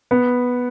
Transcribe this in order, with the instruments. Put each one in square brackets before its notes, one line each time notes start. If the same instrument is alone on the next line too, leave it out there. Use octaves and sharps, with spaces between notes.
[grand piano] B3